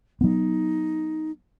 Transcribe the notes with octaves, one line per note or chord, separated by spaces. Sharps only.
F#3 B3 D#4